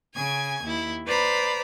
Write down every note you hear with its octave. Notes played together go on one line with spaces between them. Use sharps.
C#3 G#5 G#6
D#2 E4
B4 C5 D5 A#5 B5